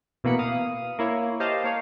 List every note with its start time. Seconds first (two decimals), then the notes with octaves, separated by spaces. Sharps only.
0.24 B2 E3 A#3 B3 B5 C#7
0.39 F5 D#6
0.99 A#3 E4 C#5
1.40 G4 C5 D#5 F5 A5
1.64 A#3 C#5 F5